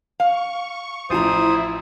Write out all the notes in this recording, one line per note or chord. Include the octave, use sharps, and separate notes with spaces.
F5 C#6
A1 F3 E4 C5 A#5 D#6